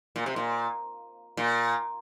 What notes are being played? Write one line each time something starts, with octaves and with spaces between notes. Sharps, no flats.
A#2
C3
A#2
A#2